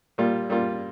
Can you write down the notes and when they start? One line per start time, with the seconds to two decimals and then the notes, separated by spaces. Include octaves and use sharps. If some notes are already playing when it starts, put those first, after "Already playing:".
0.18 A#2 G3 A#3 F4
0.49 A#2 G3 A#3 F4